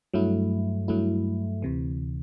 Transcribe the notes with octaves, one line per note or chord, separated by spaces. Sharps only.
G2 F#3 A3 E4
G2 F#3 A3 E4
D2 C3 E3